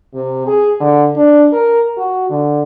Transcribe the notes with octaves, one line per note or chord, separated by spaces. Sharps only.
C3
G#4
D3
D4
A#4
F#4
D3